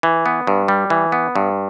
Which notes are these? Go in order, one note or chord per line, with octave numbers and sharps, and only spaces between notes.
E3
B3
G2
G3
E3
B3
G2